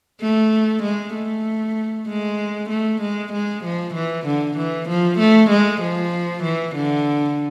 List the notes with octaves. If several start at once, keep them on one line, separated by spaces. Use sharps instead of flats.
A3
G#3
A3
G#3
A3
G#3
G#3
F3
E3
D3
E3
F3
A3
G#3
F3
E3
D3